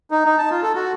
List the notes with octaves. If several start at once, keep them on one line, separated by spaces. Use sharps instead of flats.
D#4
D#4
A5
F4
A4
F#4